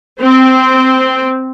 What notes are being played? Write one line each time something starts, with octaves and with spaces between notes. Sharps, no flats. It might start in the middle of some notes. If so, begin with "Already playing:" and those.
C4